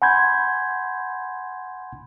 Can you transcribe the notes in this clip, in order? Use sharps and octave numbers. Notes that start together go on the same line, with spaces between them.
F#5 G#5 B5 C6 G6 G#6